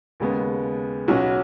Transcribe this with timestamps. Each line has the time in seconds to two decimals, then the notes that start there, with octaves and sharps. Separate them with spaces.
0.20 D#2 C#3 G#3 B3
1.08 B1 B2 F#3 C#4 F#4